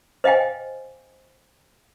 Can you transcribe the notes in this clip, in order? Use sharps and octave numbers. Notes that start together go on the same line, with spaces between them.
C5 D#5 F5 G5 G#5